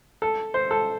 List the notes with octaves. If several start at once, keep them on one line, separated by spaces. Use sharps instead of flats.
A4
C5
A4